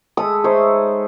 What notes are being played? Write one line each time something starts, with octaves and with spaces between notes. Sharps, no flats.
G#3 A4 B5 D#6
D#4 C5 C#5 E5